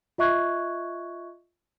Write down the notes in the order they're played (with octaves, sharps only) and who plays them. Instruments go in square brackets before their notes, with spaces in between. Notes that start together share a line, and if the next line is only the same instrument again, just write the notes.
[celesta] F4 D#5 E5 C#6 F#6 G#6